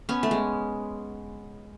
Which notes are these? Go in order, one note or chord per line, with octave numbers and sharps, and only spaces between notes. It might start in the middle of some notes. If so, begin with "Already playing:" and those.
B3 C#4
A3
G#3